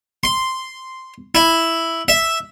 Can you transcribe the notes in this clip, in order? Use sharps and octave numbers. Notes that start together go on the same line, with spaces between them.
C6
E4
E5